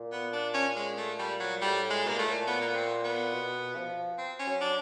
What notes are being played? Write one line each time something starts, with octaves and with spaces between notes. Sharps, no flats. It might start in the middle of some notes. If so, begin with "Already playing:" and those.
Already playing: A#2
B3
D4
C#4
G#3
A3
G3
F#3
A2 G3
G#3
B2 A#3
A#2
A2 A3
A#2
B3
A#3
B3
C4
B3
B2
F3
C4
C#4
F#3
D4